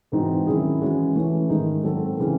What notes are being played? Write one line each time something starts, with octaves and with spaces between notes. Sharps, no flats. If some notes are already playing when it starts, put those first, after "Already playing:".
G#2 E3 C4 D#4 F#4
D#3 F#3 C#4 E4 G#4
E3 G#3 C#4 F#4
E3 A3 C#4
G#2 D#3 G#3 D#4
G#2 F#3 C4 F#4 A4
C#3 E3 C4